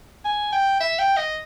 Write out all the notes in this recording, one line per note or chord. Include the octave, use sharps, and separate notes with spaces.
G#5
G5
E5
G5
D#5